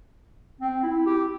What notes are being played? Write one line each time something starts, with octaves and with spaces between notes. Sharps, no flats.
C4
E4
G4